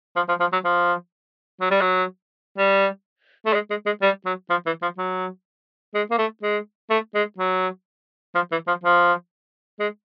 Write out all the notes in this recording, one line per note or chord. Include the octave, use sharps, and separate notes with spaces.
F3
F3
F3
F#3
F3
F#3
G3
F#3
G3
A3
G#3
G#3
G#3
G3
F#3
F3
E3
F3
F#3
G#3
A#3
A3
G#3
A3
G#3
F#3
F3
E3
F3
F3
G#3